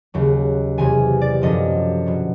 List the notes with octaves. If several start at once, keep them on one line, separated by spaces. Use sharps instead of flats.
D#2 C#3 F#3
E2 C3 E3 G#5
D5
F#2 D3 F3 D#5
B2 F#3